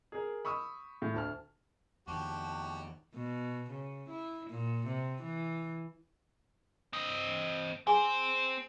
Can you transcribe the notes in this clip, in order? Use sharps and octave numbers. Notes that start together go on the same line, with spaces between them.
G#4 A#4
B5 C#6 D#6 E6
A2
D2 A5 F6
F2 D#3 F#4 G4 A5
B2
C#3
E4
A#2
C3
E3
C4 D#5
C4 G#4 C5 G#5